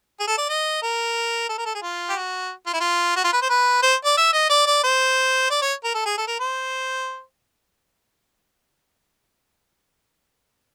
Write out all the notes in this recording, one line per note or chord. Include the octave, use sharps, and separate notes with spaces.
G#4
A4
D5
D#5
A#4
A4
A#4
A4
G#4
F4
G4
F#4
F4
E4
F4
F#4
F4
B4
C5
B4
C5
D5
E5
D#5
D5
D5
C5
D5
C#5
A#4
A4
G#4
A4
A#4
C5